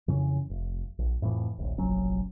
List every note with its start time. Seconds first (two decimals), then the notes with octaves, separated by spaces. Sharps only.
0.08 F2 C#3 E3 C#4
0.50 F1
0.99 A#1
1.22 F2 A2 C3 E3
1.58 D#1 A#1
1.78 F1 A#1 F#3 C#4